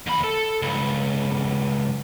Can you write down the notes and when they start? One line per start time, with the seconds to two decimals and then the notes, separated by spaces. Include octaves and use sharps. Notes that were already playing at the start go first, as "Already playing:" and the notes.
0.07 D#2 B5
0.24 A4
0.62 C#2 G2